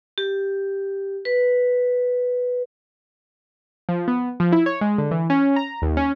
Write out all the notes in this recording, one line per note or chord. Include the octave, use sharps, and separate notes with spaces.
G4
B4
F3
B3
F3
E4
C#5
G#3
D3
E3
C#4
A#5
D#2
C#4